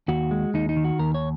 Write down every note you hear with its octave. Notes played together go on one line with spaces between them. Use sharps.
D#2 F#4
G#3
D#2 D#4
D#4
D#3
F#4
D#2 A#4
C#5